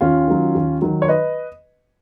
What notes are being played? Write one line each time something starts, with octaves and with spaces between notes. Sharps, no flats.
D#2 C#4 F4
D#3 F#3
D#2
D#3 F#3
C#5
B4 D#5